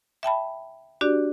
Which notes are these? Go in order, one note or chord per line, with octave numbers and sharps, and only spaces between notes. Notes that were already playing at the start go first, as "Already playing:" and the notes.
E5 G5 A5 B5
D4 F#4 G4 D5